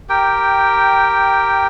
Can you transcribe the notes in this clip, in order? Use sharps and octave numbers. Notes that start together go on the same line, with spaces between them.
G4 A#4 G5